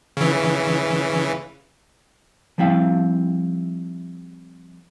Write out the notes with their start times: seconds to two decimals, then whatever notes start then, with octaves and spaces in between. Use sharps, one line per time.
0.17 C#3 E3
2.58 F3 G3 C4 E4 F5